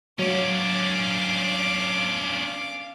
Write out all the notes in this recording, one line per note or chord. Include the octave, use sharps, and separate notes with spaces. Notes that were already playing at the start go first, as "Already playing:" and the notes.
F#3 C#4 D4 F5 D6